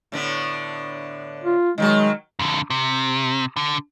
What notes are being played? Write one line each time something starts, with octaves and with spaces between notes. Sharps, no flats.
A2 D3 B3
F4
D#3 F3 F#3 G#3
F2 D3
C3
D3